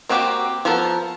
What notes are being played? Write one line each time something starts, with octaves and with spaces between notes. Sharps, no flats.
A#3 C4 F#4 G4 G5
F3 B3 A4 A#4